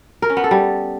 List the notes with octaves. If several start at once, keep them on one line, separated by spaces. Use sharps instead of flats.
A#4
C#4
B3
A4
G3